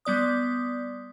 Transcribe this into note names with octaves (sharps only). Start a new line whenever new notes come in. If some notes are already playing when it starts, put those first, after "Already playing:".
G3 B3 D5 D#6